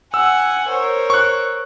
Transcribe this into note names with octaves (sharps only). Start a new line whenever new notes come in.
F#5 G#5 E6
A#4 C5 C#5
C#6 F#6